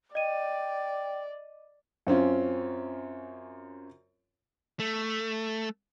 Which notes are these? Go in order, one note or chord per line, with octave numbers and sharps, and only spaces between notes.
D5 D#5 G5 D#7
F#2 C4 C#4 F4
A3